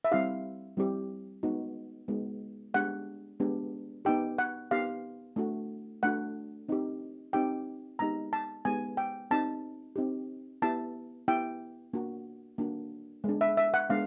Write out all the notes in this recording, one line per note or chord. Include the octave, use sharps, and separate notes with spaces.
E5
G3 C4 E4 G4 F5
G3 C4 E4 G4
G#3 B3 D#4 F#4
G#3 B3 D#4 F#4
G#3 B3 D4 G4 F#5
G#3 B3 D4 G4
B3 D#4 G4 G5
F#5
B3 D#4 G4 F5
A3 D4 F#4
A3 D4 F#4 F#5
C4 D#4 G4
C4 D#4 G4 G5
G#3 B3 D#4 G4 A#5
A5
G#3 B3 D#4 G4 G#5
G5
C4 D#4 G4 A5
C4 D#4 G4
B3 E4 G4 A5
B3 E4 G4 G5
A#3 D4 F#4
A#3 D4 F#4
G#3 B3 D4
E5
E5
F#5
G#3 B3 D4 F5